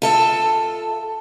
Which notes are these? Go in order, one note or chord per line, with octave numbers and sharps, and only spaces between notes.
F4 A4 E5